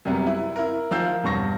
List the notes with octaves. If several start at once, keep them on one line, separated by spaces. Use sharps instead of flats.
F#2 C3 G3 B3
E4
E4 A#4
D#3 F3 A#4 F5 E6 G6
E1 G2 C#6 A#6